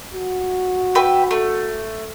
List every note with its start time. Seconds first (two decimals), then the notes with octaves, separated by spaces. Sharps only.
0.14 F#4
0.95 B4 E5 G5
1.31 A3